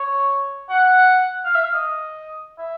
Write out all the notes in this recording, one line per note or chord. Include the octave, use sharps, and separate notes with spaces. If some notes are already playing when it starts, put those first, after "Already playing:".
Already playing: C#5
F#5
F5
E5
F5
D#5
E5